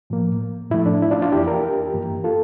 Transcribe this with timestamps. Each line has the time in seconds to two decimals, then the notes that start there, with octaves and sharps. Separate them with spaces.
0.10 A2 F3 A#3
0.70 A2 F3 A3 E4
0.86 D4
1.02 E4
1.11 D4 F4
1.22 D4 F4
1.32 F2 E3 A#3 E4 G4
1.47 G4 A#4
1.93 G2 E3 A#3
2.24 F4 A4